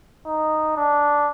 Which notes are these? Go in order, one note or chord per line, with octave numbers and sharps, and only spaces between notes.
D#4
D4